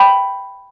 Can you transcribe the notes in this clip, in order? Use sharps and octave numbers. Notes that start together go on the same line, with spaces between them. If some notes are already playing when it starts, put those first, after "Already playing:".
Already playing: G5 B5